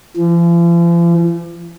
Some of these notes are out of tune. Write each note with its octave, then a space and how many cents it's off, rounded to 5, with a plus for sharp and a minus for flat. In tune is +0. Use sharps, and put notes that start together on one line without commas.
F3 -45